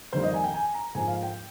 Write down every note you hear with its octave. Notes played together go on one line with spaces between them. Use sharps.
F2 D#3 G3 A#3 C5
D#5
G#5
G5
G#5
A#5
G#2 F3 A#3 G#5
F5
G5